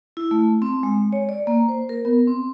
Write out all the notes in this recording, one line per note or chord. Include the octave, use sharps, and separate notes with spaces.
E4
A3
C4
G#3
C#5
D5
A#3
C5
A#4
B3
C4